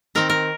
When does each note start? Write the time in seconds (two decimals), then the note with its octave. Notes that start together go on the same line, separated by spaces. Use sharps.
0.15 D#3 C4 A#4
0.30 A#4